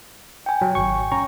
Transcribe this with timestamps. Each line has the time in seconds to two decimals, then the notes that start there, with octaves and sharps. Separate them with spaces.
0.46 G5 G#5
0.61 F#3
0.75 G#1 C#6
1.12 C#4 A#5 C#6